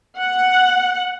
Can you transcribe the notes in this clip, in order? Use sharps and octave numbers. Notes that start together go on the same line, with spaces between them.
F#5